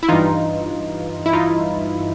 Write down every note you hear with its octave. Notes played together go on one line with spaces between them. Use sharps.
E4
G2 E3 D#4 F4
E4
D#4 F4